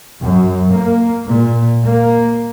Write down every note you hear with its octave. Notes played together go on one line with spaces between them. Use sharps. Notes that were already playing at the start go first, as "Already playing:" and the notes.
F#2
A#3
A#2
A#3